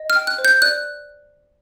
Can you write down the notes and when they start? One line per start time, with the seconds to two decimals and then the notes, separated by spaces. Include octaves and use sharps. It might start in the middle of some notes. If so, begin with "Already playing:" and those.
Already playing: D#5
0.10 F6
0.16 G5
0.27 F#6
0.38 C5
0.45 G6
0.62 D5 F#6